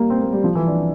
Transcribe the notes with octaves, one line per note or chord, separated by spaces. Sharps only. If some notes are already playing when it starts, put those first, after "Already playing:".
Already playing: G3 A#3
C4
A#3
G3
F3
E3
D4